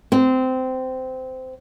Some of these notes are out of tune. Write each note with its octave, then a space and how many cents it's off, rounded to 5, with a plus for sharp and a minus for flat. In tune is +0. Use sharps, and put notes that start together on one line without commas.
C4 -20